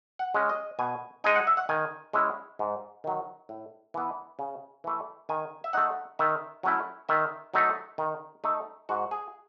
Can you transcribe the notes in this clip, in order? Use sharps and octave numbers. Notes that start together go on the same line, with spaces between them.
F#5
G#3 C#4
D#5
B2 G#5
G#3 D#4 G#5
F#5
E5
F#5
D#3 G#5
G#3 C#4 E4
G#2
D#3 F#3
A2
E3 B3
C#3
E3 A3
D#3 G#5
E5
A3 D#4 F#5
D#3 E5
F#3 A3 C#4 E4
D#3 E5
F#3 A3 D#4
D#3
A3 D#4
G#2 F#4
G#4